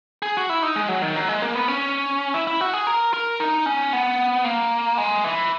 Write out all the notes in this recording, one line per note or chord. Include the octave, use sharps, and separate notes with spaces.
G#4
F#4
E4
D#4
G#3
F#3
D#3
F#3
G#3
A#3
B3
C#4
E4
E4
F#4
G#4
A#4
A#4
D#4
C#4
B3
A#3
G#3
E3